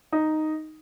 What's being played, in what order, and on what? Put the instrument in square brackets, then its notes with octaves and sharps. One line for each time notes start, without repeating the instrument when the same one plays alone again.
[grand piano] D#4